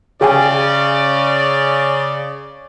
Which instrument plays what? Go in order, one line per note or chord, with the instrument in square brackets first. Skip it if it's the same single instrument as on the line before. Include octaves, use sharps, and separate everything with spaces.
[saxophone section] C#3 [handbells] G#4 G5 G#5 [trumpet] D5